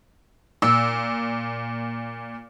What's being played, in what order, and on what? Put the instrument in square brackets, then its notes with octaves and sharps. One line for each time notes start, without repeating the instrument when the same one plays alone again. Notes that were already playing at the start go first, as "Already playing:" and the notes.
[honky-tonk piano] A#2 [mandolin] E6